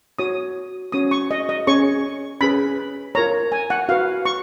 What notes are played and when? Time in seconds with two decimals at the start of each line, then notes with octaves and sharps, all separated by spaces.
0.19 F#4 C#5 D#6
0.92 C#4 F#4 C#5 D#6
1.11 C#6
1.31 D#5
1.49 D#5
1.67 C#4 G#4 C#5 C#6
2.41 C#4 G#4 B4 B5
3.15 F4 A#4 C#5 A#5
3.52 G#5
3.70 F#5
3.89 F#4 B4 F5
4.25 C#6